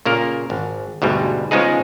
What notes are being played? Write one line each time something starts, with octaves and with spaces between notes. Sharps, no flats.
A#2 C#3 A#3 A#4
G#1
D2 G#2 B2 G3
C#3 F3 G#3 B3 D#4 G#4